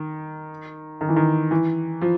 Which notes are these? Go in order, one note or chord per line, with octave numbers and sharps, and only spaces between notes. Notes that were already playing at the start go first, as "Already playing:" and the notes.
Already playing: D#3
D#3
E3
D#3
E3
F3